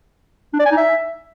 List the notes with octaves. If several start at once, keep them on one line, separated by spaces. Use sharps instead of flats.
D4
D5
G#5
D#4
E5